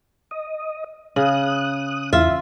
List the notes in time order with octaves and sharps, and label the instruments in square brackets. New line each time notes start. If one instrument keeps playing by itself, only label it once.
[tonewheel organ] D#5
[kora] C#3 [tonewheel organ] D#6 F#6
[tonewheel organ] E2 E4 [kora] F4 [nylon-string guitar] E5